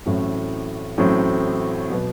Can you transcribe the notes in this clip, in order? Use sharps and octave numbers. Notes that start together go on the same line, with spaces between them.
A1 A2 F#3 C4
A1 A2 F#3 C4
B2 F#3 B3